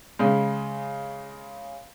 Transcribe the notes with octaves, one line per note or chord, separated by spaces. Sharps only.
C#3 G#3